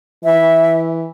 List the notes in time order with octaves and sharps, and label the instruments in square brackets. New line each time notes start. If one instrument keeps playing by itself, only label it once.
[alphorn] E3 [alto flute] E5